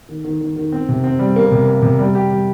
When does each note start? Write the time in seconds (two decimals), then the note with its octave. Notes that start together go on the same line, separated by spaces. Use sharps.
0.09 D#3
0.24 D#3
0.41 D#3
0.56 D#3
0.72 C4
0.89 C3
1.04 C4
1.19 G3
1.36 A#3
1.51 C3
1.67 A#3
1.82 C3
1.98 G3
2.15 G4
2.31 G3